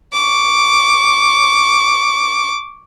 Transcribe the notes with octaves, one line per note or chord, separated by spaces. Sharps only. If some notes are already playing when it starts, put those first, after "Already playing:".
C#6 D6